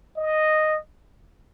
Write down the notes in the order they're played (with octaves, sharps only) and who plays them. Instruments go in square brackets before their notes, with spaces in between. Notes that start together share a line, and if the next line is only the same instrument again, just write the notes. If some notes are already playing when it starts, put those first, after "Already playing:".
[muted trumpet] D#5